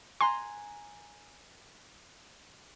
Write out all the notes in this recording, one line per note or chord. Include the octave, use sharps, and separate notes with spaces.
G#5 A#5 C6 F#6